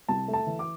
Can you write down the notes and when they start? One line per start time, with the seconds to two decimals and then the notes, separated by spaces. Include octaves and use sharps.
0.08 C2 A5
0.28 A3
0.34 A5
0.47 E3
0.59 D6